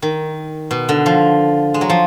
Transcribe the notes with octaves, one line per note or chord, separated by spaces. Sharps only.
D#3
B2
D3
F3
G#3
F#3
F3